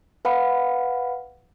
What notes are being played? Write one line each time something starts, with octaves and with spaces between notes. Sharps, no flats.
B4 F5 F#5 B5